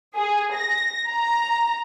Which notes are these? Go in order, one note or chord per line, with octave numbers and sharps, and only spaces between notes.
G#4
A#6
A#5